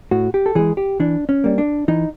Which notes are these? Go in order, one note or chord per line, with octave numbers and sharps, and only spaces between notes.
A2 F#4
G4
A4
E3 G#3 G#4
G4
E3 D4
C#4
G3 A#3
D4
E3 D#4